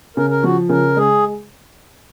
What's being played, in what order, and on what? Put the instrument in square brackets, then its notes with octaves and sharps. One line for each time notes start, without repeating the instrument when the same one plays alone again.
[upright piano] C#3 [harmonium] A#4
[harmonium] A#4
[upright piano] F3 [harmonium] F#4
[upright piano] C#3 [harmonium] A#4
[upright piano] G#3 [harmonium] G#4